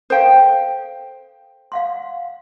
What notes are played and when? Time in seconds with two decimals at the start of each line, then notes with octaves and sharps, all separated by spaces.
0.10 A4 C5 F5 G5
1.72 F5 F#5 C6